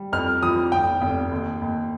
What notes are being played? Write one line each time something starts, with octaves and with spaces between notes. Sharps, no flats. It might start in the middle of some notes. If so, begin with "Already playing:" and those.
Already playing: G3
F2 F6
F3 D#6
F1 G5
F1
D#2
D#2